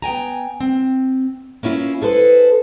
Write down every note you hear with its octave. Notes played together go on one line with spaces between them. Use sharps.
B3 G5 G#5 A#5
C4
A#3 C#4 E4 F4
G#4 A4 B4 C5